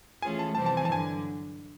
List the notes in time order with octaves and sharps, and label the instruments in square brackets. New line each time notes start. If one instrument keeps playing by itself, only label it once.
[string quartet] E3 A3 C#4 F4 G#4 [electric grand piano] G#5
[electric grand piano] A5
[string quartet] F2 C3 E3 G3 C4 [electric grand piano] A5
[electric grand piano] A5
G#5
A5
[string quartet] G2 D3 F#3 [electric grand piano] G#5